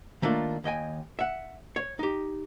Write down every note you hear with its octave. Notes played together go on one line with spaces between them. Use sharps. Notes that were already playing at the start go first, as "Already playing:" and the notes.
D#3 A3 A#3 D4 F4
D#2 D#5 G5 G#5
E5 F#5
C#5
D#4 G4